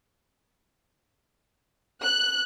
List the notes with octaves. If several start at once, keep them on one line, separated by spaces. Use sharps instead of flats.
F#6